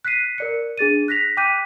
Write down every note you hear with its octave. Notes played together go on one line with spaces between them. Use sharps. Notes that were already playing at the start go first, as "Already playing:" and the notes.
F#6 B6 C7 D#7
A#4 D5 C#7
D4 G#4 A6 D#7
F#6 A#6 B6 F7
G5 D6 F#6 G6 B6 D#7